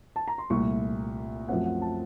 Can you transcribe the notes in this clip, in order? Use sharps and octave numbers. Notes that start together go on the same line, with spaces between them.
A5
A#5
C6
C2 A#2 A3 C#6
F#2 F3 A3 C4 F#5
F#5
A5